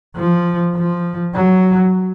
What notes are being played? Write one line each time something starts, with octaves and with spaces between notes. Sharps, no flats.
F3
F3
F#3